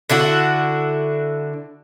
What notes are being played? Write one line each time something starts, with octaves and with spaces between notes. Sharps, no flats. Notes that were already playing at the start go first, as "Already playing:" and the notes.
D3 D4 E4 F#4